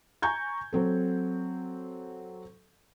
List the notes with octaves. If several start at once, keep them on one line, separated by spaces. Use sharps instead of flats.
G#5 A#5 C#6 G6 G#6
F#3 C4 A4